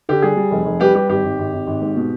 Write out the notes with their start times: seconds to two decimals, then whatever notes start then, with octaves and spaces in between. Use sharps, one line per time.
0.09 D3 G4
0.22 G3 G#4
0.37 G3
0.51 F1
0.65 F1
0.80 G3 G4 B4
0.94 G3 G4 B4
1.09 G#1 G4
1.24 G#1
1.39 G#1
1.53 G#1
1.67 G#1
1.81 G#2
1.96 B2